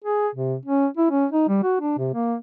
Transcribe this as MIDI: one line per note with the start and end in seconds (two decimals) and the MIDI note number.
0.04 0.28 68
0.35 0.56 48
0.65 0.87 61
0.97 1.09 64
1.11 1.26 61
1.31 1.46 63
1.48 1.59 55
1.63 1.79 66
1.81 1.97 62
1.98 2.09 48
2.14 2.36 58